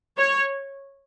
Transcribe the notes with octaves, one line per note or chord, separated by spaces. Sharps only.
C#5